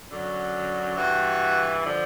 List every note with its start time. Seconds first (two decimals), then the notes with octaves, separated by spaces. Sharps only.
0.10 F#2 D3 F#3
0.97 G2 E3 F#4
1.85 D3 F3